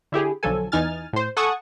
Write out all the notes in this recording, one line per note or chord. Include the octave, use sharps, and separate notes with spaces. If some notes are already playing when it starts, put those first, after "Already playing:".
D3 E4 G4 G#4
B1 D3 F3 F#3 A4 G#5
E2 E3 D#4 G#5 F6 A6
A2 C5
A4 F#5 G#5 A5 C#6 D#6